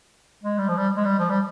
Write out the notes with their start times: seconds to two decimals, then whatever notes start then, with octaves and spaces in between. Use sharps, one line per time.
0.44 G#3
0.58 G3
0.68 F3
0.77 G3
0.96 G#3
1.05 G3
1.19 F3
1.30 G3